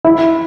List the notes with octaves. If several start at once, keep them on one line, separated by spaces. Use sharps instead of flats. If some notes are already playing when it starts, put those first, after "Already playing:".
E4